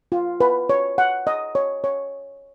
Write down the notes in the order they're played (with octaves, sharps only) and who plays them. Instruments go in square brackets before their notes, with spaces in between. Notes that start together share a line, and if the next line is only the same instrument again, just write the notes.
[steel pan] F4
B4
C#5
F#5
D#5
C#5
C#5